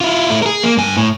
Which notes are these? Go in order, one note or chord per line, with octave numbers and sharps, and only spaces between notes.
E4 F4
A3 E4
G#4 A#4
A#3
G2 G#5
A2